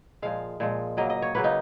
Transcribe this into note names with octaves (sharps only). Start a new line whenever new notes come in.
A#2 F3 G#3 F5
A#2 F3 G#3
C#3 F#3 A#3 D#5
D#5
C#5
C#3 F#3 A#3 B4
D#4